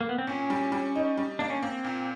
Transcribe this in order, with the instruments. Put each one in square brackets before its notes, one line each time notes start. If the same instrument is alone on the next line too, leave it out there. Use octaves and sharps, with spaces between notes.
[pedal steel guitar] A#3
B3
C4
[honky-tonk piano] A#2 [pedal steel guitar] C#4
[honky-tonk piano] G3
G3
D#4
G3
[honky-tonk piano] A#3 [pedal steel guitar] D4
[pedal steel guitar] C#4
[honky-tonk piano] A#3 [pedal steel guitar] C4
[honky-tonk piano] A#2